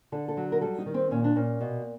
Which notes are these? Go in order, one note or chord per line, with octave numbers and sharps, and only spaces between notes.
D3 A4
A4
F#3
A#4
G3 A4
D#4
D#3
C4
A#2 C#4
D4
A#2 C#4
B2